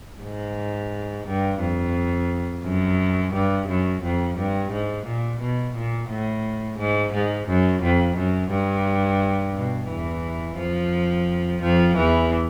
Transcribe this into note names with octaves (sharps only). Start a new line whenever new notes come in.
G#2
G2
F2
F#2
G2
F#2
F2
G2
G#2
A#2
B2
A#2
A2
G#2
G#2
F#2
F2
F#2
G2
B2
E2 E3
F2 F3
F2 F3
E2 E3